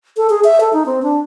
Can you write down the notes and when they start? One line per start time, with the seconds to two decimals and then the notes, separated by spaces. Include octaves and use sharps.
0.17 A4
0.30 G#4
0.44 E5
0.60 A4
0.73 D#4
0.86 C4
1.03 D4